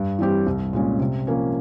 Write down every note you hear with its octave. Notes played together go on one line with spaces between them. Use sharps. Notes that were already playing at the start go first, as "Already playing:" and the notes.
Already playing: G2
E3 G3 C4 G4
C2
A#2 G#3 C#4
C3
F3 A#3 C#4